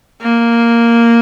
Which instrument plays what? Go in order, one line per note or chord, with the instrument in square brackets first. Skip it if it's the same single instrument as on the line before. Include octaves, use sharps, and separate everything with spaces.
[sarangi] A#3